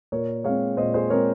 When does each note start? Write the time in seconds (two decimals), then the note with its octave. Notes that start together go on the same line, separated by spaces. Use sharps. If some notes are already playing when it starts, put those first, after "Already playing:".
0.12 A#2 A#4 C#5
0.44 G#3 C4 C#5 F5
0.77 A#2 C5 D#5
0.94 G#4 C5
1.10 G#3 C4 A#4 C#5